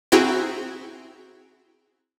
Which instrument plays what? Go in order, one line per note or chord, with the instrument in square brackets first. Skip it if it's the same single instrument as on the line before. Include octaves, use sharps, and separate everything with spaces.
[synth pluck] C4 E4 F#4 G#4 G5 A#5